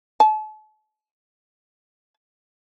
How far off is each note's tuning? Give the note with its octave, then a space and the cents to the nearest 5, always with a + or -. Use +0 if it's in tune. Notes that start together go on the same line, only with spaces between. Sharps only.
A5 -40